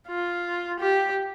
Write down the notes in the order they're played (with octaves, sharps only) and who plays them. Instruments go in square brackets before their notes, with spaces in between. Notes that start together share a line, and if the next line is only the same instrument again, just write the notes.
[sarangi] F4
G4